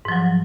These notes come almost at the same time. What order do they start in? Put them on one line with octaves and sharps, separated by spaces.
G#2 F3 F#3